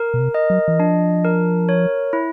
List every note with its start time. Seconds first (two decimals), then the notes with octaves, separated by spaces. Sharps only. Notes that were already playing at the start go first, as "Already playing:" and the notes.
Already playing: A#4
0.14 B2
0.20 C3
0.34 D#5
0.50 F#3
0.68 E3
0.79 F3 D4
1.25 A#4
1.69 C#5
2.13 E4